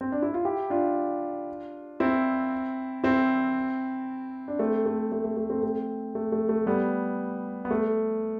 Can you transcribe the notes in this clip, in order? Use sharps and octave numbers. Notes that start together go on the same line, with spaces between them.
C4
D4
E4
F4
E4 G4
D4 F4
C4 E4
C4 E4
D4
A3 C4
A3
A3
A3
A3
A3 C4
A3 C4
A3
A3
A3
G3 B3
B3
A3